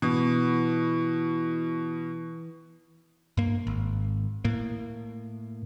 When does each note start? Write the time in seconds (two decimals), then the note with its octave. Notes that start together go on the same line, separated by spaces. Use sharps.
0.02 B2 E3
3.37 G2 A#3
3.67 G#1
4.45 A2 A#3